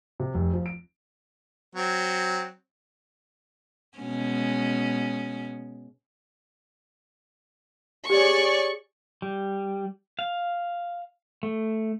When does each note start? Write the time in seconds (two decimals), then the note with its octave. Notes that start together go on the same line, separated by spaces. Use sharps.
0.20 C3
0.34 F1
0.53 F3
0.66 D7
1.75 F#3 C4
3.98 B2 G#3 C#4
8.10 G4 G#4 C#5 D5 G#5 C#6
9.22 G3
10.19 F5
11.43 A3